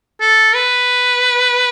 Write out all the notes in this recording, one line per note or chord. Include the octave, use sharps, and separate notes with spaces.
A4
B4